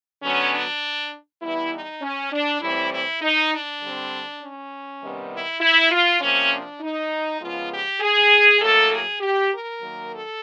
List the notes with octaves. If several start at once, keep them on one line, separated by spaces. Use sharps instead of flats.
D3 F#3 B3 C#4
D4
E3 G3 B3 E4
D#4
C#4
D4
A2 E3 G3 C4 E4
E4
D#4
D4
D3 G3 C4
C#4
C3 D#3 G3 B3
E4
E4
F4
C3 F3 A#3 C#4
D4
D#4
C#3 F3 G#3 B3 F4
G4
G#4
A2 F#3 A#3 A4
G#4
G4
A#4
D#3 F#3 A#3
A4